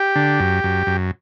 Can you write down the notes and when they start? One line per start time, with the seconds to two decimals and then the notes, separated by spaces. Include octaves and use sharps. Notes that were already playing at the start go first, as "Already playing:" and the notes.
Already playing: G4
0.16 D3
0.40 F#2
0.64 F#2
0.87 F#2